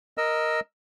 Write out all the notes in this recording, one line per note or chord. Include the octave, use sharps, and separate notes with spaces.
A#4 D#5 E6